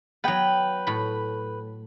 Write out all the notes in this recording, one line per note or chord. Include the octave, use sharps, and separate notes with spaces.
F#3 B3 B4 G5
A2 B5